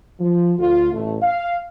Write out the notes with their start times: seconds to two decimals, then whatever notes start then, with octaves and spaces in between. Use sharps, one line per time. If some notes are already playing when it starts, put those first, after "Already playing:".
0.19 F3
0.58 D2 F4
0.92 A1 A3
1.22 F5